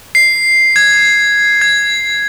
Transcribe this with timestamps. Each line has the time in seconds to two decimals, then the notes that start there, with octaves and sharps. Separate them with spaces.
0.15 C7
0.76 G#6
1.61 G#6